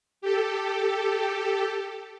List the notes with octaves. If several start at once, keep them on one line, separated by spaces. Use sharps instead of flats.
G4 A4